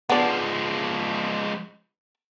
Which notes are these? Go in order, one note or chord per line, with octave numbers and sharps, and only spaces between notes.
F3 G#3 B3 D4